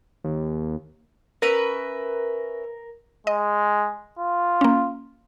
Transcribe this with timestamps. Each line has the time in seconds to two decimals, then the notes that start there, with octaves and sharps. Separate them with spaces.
0.24 D#2
1.42 C#4 A#4 B4 E5
3.27 G#3 D#5
4.19 F4
4.61 A#3 C#4